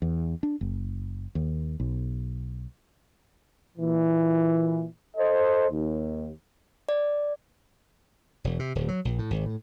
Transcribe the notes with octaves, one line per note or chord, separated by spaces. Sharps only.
E2
D4
F#1
D#2
B1
A#2 E3
A4 C5 D#5
D#2
D5
E1
C3
D1
F#3
A#1
A2
G#1
A2